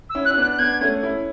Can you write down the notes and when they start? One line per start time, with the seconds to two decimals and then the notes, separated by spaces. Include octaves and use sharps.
0.10 E6
0.15 C#4 E4
0.25 F#6
0.30 C#4
0.37 B3 D4 F#6
0.52 F#6
0.59 B3 D4 G#6
0.81 A3 C#4
1.03 C#4 E4